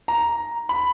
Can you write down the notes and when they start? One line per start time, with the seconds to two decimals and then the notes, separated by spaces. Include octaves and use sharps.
0.08 A#5
0.69 B5